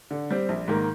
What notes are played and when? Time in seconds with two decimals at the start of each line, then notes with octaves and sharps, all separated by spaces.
0.11 D3
0.31 G3 C4
0.49 A#1
0.68 G#2 D#3 A#3